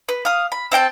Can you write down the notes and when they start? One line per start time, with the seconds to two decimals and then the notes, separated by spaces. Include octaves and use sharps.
0.09 B4
0.25 F5 D#6
0.52 B5
0.72 C4 E5 G5 A5